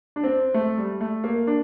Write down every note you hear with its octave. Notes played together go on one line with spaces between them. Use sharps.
D4
C4
A3
G3
A3
A#3
D4